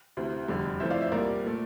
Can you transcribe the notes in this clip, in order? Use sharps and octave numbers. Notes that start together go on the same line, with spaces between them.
D2 C3 E3
F1 E2 D3 G3
F2 E3 A3 C5 E5
D5 F5
C5 E5
C2 A#2 G3 A#4 D5
A#2 A3